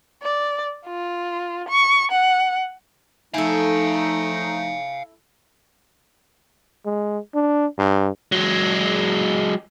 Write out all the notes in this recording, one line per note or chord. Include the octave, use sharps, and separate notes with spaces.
D5
F4
C#6
F#5
F3 A3 D#4 E4 A4 F5 G#5
G#3
D4
G2
F#3 G#3